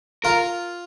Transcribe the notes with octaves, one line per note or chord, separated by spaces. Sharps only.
F4 A#4